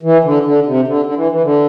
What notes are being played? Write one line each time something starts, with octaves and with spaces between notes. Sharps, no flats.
E3
D3
D3
C3
D3
D3
E3
E3
D3